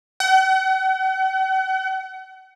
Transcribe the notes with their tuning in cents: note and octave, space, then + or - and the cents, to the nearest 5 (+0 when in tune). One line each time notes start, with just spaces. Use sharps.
F#5 +40